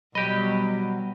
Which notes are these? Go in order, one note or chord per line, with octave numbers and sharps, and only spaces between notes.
B2 F#3 G3 G4 D#5 B5